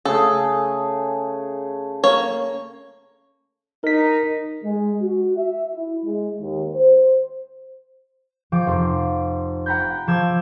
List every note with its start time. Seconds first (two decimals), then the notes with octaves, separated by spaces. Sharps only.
0.05 C#3 A3 G#4 A4
2.04 A#3 C#5
3.84 D#4 A#4 B6
4.63 G#3
5.02 F#4
5.37 E5
5.75 E4
6.06 G#3
6.41 D#2
6.75 C5
8.52 F3 G5 D6
8.67 F1 C6
9.66 F#5 G5 A#5 B5 G6
10.07 F3 A5 D6 E6 G6 G#6